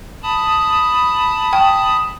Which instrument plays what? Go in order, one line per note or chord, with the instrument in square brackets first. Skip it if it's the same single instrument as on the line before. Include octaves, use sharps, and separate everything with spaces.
[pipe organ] A5 B5 D#6
[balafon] G5